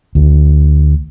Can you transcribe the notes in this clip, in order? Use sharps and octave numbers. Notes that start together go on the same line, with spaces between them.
D2